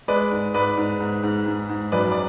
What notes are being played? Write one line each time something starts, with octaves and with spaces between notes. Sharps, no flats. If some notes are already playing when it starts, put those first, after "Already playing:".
G#3 B4 D5
G#2
G#2 B4 D5
G#2
G#2
G#2
G#2
G#2
F#2 B4 D5
D5